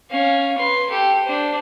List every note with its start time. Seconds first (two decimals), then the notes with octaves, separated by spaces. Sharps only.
0.10 C#4 F5
0.57 B4 C6
0.90 G4 A4
1.24 D4 C5